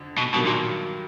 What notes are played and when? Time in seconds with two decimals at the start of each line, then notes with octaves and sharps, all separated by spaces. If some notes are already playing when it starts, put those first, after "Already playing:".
Already playing: F2 D3
0.18 B2
0.34 G2 B2 D#3 F#3 A#3
0.46 A#2